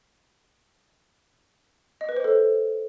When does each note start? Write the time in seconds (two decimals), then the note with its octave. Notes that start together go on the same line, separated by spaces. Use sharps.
2.01 D#5
2.09 B4
2.17 C5
2.24 A4